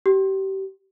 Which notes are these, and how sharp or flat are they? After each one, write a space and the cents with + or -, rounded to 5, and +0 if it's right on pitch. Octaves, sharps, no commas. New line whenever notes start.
G4 -30